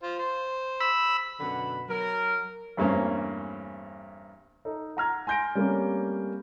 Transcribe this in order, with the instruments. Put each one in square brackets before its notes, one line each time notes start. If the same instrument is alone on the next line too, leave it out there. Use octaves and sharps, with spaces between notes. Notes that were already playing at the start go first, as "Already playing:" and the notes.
[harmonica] F4 C5
C5
[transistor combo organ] B5 E6
[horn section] F#2 B2 D3 F#5 B5
F#3 A#4
[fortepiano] E2 G2 A3 A#3 C4 C#4
[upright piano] D#4 A4
F#5 A#5 F6 G#6
G#5 C6 G6 A#6 D7
G3 A3 A#3 C4 C#4